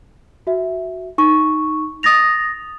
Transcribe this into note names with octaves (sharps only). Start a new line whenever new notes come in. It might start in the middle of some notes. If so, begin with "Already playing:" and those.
F#4 E5
D#4 C#6
D#6 A6 A#6 F7